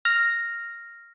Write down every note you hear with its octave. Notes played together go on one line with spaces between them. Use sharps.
F6 A#6